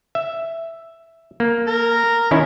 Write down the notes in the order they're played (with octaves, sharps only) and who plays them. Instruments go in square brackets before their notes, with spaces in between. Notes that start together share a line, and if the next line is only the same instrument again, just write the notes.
[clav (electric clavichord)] E5
A#3
[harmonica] A#4 A#5
[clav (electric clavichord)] D#3 C#4 E4